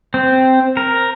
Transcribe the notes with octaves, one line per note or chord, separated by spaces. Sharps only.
C4
A#4